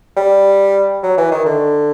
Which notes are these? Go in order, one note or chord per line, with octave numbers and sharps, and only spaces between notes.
G3
F#3
E3
D#3
D3